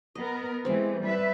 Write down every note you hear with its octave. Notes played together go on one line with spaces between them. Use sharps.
B3 A#4 D#5
E3 G#3 A3 C4 G4
G3 B4 E5